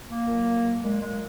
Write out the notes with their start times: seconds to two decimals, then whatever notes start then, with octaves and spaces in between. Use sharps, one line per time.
0.10 A#3
0.27 A#2 F#3
0.82 A#2 F#3 G#3
1.02 G#3